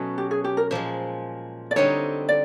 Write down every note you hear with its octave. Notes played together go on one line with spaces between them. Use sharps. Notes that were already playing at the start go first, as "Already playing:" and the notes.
Already playing: B2 F#3 A3 C#4
G4
G#4
G4
A#4
A#2 F3 G#3 C5
D5
D3 G3 C4 D#4 C#5
D5